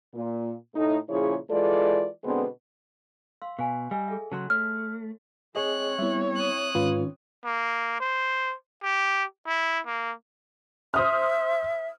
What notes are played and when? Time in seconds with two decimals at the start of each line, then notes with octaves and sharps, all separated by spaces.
0.14 A#2
0.75 A2 A3 D#4
1.08 A#2 C#3 F3 E4 G#4 C#5
1.50 E3 G#3 F4 A4 D5
2.24 B2 D3 G#3 B3 C4 D4
3.42 F5 C6 E6
3.59 B2 F5 G#5
3.91 G3 D#5 G#5 E6
4.08 G#4 A4 E5
4.32 C#3 F#3 A5 C6
4.50 A3 C#5 F6
5.56 C4 G#4 C#5 D#5 F#6
5.99 G3 B3 E4 E5
6.36 D#6 F#6
6.75 G#2 D#3 C#4 F4 B4
7.44 A#3
8.00 C5
8.84 G4
9.47 E4
9.87 A#3
10.94 C5 E5 D#6 F6